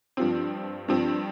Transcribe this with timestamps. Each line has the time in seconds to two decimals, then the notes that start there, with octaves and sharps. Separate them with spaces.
0.17 G2 F3 C4
0.88 G2 F3 C4